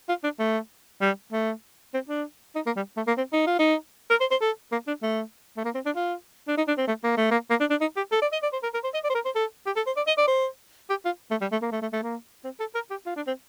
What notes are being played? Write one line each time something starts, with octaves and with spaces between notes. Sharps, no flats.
F4
D4
A3
G3
A3
C4
D4
D#4
A#3
G3
A3
A#3
C4
D#4
F4
D#4
A#4
C5
C5
A4
A#3
D4
A3
A3
A#3
C4
D4
F4
D4
D#4
D4
C4
A3
A#3
A3
A#3
A#3
D4
D4
D#4
G4
A4
D5
D#5
D5
C5
A#4
A#4
C5
D#5
D5
C5
A#4
C5
A4
G4
A4
C5
D5
D#5
D5
C5
G4
F4
A3
G3
A3
A#3
A3
A3
A3
A#3
C4
A4
A#4
G4
F4
D4
C4